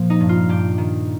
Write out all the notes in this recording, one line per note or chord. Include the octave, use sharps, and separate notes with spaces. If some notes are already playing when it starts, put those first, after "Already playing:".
Already playing: A#2 F3 F4
D#4
G2
F4
G2 G4
D#3